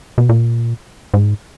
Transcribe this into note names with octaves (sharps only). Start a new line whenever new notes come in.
B2
A#2
G#2